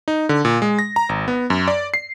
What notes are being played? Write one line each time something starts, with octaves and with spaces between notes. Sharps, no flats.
D#4
D3
A#2
G#3
A#6
A#5
G#1
B3
F#2
D5
C7